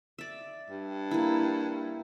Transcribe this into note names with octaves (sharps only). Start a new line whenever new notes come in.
D5 E5
G2
A#3 E4